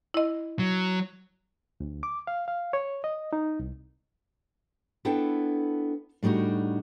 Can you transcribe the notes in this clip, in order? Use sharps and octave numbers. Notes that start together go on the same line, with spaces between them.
E4 D#5
F#3
D2
D6
F5
F5
C#5
D#5
D#4
C2
B3 D4 E4 A4 G5
A2 G3 D4 D#4 F#4